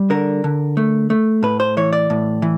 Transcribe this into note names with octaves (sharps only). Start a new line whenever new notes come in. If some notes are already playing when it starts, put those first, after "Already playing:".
Already playing: G3
D3 A#4
D3
A3
A3
A2 B4
C5
E3 C#5
D5
A2
E3